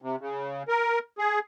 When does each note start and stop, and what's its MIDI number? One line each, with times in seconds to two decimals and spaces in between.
0.02 0.16 48
0.21 0.63 49
0.68 0.99 70
1.18 1.39 68